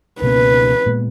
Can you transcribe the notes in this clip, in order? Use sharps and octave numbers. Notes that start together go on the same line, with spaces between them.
C#2 B2 A#3 C#4 B4
A#2 G#3 B3